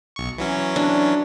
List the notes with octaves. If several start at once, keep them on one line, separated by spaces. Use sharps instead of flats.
B1 C#6
E3 F#3 C#4
D4